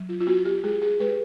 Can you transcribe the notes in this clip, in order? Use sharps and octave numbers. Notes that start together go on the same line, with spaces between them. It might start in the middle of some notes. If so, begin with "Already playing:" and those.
Already playing: F#3
F4
F4
B3 F#4
G4
G#3 G#4
G#4
G#3 B4